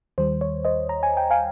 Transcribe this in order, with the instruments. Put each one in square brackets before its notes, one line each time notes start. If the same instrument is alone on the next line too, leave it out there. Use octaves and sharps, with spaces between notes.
[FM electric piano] D#2 D#3 G3 C5
C#5
C5 D#5
A#5
G#5
G5
F5 G#5